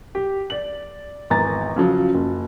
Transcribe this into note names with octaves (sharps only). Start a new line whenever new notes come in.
G4
D5 F#7
G#1 E2 G#5 A#5 A6
C#3 F3 F#3
F#1